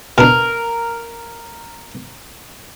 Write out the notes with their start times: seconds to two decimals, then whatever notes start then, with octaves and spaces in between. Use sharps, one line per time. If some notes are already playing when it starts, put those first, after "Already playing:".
0.18 B2 D4 A#4